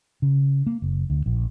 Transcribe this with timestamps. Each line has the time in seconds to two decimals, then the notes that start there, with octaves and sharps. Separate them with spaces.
0.22 C#3
0.66 A#3
0.82 F#1
1.10 D2
1.26 A#1